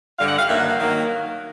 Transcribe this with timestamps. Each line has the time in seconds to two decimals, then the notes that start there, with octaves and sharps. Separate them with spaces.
0.18 G2 D3 G3 F5
0.28 F#5
0.38 F5
0.48 G2 D#3 F#3 A#3 E5
0.59 F#5
0.68 F5
0.80 D#3 F#3 A#3